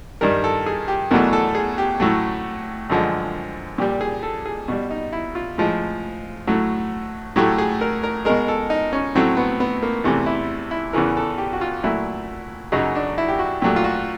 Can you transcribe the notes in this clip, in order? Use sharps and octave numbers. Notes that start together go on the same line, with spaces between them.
G2 D#3 G3 A#4
A4
G#4
G4
E2 B2 F#3 A3 A#4
A4
G#4
G4
A2 F#3 A3
F#2 D3 F3 G#3
A#2 G3 G4
G#4
A4
G#4
B2 G3
D#4
E4
F4
A2 F3 G#3
A2 F#3 A3
A2 F#3 A3 G4
G#4
A#4
A#4
B2 G#3 A#4
A4
D#4
C#4
A2 F#3 A3 C4
B3
B3
A#3
E2 C3 E3 A3
E4
E4
E2 C#3 E3 A#4
A4
G4
F#4
F4
A#2 F#3 A3 E4
F#2 C#3 F#3 D#4
D4
E4
G4
F#4
A#2 F#3 A3 G4
F4
F#4